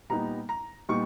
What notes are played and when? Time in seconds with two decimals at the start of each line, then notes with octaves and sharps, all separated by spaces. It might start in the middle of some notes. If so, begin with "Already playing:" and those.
0.10 A#2 G3 B3 D#4 A#5
0.49 A#5
0.89 A#2 G3 B3 D#4 C#6